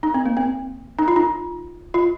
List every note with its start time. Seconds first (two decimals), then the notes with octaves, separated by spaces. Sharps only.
0.03 D#4
0.14 C4
0.25 A#3
0.37 C4
0.99 D#4
1.08 F4
1.16 D#4
1.94 F4